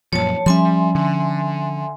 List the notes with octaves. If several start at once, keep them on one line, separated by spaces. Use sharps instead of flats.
F#2 A#2 F3 C#5 A5
F3 G3 C#4 E5 G#5 C6
D3